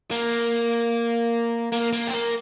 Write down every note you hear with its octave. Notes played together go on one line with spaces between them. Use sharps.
A#3
A#3
A#3
C4
A#3